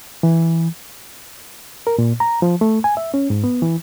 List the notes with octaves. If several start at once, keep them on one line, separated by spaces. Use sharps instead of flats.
E3
A#4
A#2
A#5
F3
A3
G#5
E5
C#4
G#2
B3
E3